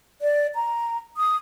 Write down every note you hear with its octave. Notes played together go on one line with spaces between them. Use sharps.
D5
A#5
D#6